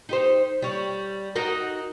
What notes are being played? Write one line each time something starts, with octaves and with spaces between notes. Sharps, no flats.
D#4 G4 C5
G3 C#5
D#4 F#4 A#4